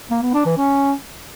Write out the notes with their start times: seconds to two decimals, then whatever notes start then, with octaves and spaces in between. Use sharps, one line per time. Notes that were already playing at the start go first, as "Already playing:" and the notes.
0.11 A#3
0.22 B3
0.34 D4
0.46 E3
0.57 C#4